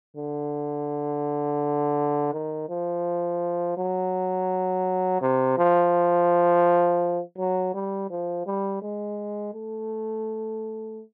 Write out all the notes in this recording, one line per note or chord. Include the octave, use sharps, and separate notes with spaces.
D3
D#3
F3
F#3
C3
F3
F#3
G3
F3
G3
G#3
A3